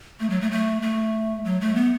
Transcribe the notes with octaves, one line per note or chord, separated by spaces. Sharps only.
A3
F#3
A3
A3
A3
F#3
A3
B3